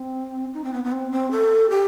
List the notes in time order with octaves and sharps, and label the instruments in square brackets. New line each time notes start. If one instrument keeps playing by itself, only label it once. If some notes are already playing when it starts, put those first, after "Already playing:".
Already playing: [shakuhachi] C4
D#4
C4
B3
B3
C4
C4
A4
G4